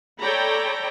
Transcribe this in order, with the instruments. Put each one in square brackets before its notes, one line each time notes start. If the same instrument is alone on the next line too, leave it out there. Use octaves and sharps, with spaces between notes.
[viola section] A4 C#5 D5 G5 A#5 B5